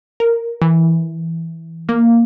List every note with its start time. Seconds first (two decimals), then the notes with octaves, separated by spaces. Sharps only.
0.20 A#4
0.62 E3
1.89 A#3